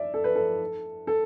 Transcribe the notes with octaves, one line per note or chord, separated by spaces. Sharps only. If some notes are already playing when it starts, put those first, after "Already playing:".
Already playing: D5 E5
A4
B4
A4
A4